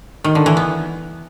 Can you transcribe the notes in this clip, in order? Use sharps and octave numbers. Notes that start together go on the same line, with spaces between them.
D#3
D3
E3
B3